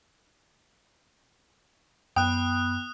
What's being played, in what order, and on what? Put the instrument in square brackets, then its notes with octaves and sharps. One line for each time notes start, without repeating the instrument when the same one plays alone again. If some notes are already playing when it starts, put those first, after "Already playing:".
[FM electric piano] F#2 [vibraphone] B3 [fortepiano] G5 [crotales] D#6 F#6